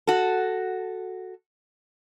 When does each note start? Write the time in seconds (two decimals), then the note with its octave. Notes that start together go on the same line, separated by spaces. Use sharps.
0.07 F#4 A4